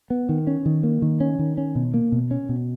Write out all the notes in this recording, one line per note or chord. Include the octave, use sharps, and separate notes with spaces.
B3
D#3
C#4
D#3
A#3
D#3
C#4
D#3
C#4
B2
A#3
B2
C#4
B2